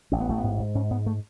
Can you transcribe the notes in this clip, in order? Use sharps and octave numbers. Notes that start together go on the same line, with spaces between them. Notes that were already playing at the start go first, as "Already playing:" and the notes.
A1 C#4
B3
A1 A3
B3
G#2
G#2
G#2 C#4
G#2 B3
A3